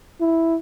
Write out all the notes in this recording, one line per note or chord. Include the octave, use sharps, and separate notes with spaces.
E4